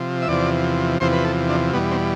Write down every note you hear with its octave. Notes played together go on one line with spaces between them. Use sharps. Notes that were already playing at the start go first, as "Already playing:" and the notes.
Already playing: C3 F3
E5
E2 C3 F3 D5
E2 C3 F3 C5
B4
A4
D4
E2 B2 G3 B3
C4